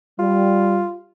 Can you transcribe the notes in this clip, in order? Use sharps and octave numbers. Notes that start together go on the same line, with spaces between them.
G3 F4